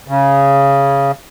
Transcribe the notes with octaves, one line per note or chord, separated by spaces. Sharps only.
C#3